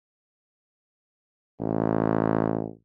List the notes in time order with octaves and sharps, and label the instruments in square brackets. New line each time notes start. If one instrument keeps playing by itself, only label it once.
[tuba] A1